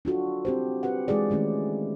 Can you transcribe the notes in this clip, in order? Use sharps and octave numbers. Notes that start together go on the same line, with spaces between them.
D4 F4 F#4 A4
C4 G4 C5
F#4 G4 B4 F#5
E3 G#3 E4 F4 G#4 D5
D#3 G#3 A3 C#4 E4